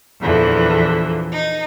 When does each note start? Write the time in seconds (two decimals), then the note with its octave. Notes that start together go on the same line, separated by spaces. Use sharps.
0.21 E2 A#2 D3 E3 F3
1.32 D#4